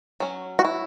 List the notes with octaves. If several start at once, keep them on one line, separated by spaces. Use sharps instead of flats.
F#3 C#4
F#4
E4